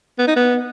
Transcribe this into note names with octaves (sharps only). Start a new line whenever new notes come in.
B3
D#4
B3